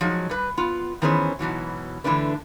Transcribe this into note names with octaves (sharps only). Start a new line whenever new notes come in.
F3 F#3 G#3 D#4
G3 B4
B3 F4
D#3 E3 B3 C#4 G#4 C5
G#2 B2 E3 F#3
D3 E3 A3 D4 B4